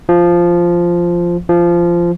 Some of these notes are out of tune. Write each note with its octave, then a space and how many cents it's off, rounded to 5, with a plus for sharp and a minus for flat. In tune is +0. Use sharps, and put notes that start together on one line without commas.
F3 -5
F3 -15